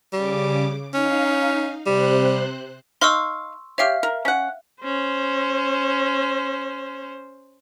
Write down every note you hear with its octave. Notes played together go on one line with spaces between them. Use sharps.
C#3 G3 D6
C#4 D#4 F5
C3 G3 C5 F#6
D#4 F5 C6 C#6 E6
G4 C#5 E5 F5 F6
A#4
C#4 F#5
C#4 C5